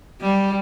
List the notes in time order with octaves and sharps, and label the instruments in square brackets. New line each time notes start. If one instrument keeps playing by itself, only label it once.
[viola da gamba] G3